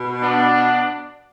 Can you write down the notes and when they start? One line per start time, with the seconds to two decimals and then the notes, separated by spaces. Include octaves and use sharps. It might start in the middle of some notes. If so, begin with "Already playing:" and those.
Already playing: B2
0.22 B3 D4